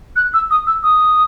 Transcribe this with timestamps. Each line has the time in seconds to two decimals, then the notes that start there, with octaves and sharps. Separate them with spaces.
0.16 F#6
0.34 E6
0.51 D#6
0.67 E6
0.83 D#6